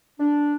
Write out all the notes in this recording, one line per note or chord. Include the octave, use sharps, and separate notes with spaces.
D4